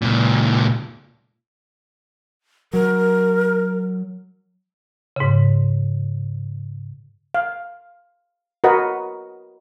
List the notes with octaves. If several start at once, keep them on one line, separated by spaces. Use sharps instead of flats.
C#2 A#2
F#3 A#4
G#2 C#3
F5
F#4 A#4 B4 D#5 F#5